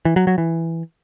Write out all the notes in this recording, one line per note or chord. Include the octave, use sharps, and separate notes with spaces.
E3
F#3
F#3
E3